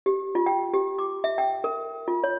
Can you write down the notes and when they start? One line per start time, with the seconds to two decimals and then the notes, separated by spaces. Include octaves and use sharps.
0.06 G4
0.35 F4
0.46 G5
0.74 G4
0.98 D6
1.24 E5
1.38 G5
1.64 A#4
2.08 F4
2.24 C#5